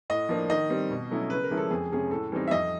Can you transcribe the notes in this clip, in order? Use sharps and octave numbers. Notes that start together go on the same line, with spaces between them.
A2 D#5
F3 A#3 D4
D#3 D#5
G3 C4
B2
F#3 A3 C#4 E4
C#3 B4
A#4
F3 G#3 C#4 E4
A4
F2 G#4
C3 F3 G#3 C#4 G#4
A2 A4
E3 G3 C4 D#4
E5
F2 D#5